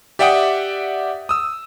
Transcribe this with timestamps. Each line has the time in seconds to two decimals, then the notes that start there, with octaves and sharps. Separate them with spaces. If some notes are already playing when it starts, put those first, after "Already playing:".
0.19 G4 D5 E5 F#5 G5 D#6
1.29 D#6 E6